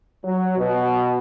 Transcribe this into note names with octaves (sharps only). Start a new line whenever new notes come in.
F#3
B2